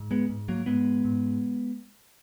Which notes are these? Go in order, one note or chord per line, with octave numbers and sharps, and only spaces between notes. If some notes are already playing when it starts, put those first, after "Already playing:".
Already playing: G#2
G#3 B3
G#2
F#3 A#3
G#2 G#3 B3
G#2